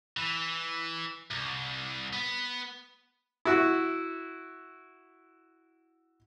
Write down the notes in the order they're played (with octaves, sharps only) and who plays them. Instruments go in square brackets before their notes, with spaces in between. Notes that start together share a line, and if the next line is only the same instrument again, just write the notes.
[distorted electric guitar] E3
C2
B3
[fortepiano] E4 F#4